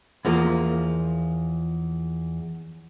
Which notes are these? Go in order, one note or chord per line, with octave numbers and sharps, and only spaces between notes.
E2 F3 A#3